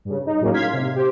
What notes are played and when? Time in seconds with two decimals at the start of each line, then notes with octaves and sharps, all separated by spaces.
0.05 G2 C#3
0.26 D#4
0.41 A2 F#3 G#3 A#3 C#4
0.54 F5 C6 G#6 B6
0.73 C3
0.96 G4 C5